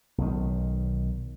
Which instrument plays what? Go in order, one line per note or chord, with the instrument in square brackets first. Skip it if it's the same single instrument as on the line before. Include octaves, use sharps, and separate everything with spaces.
[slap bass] B1 D#3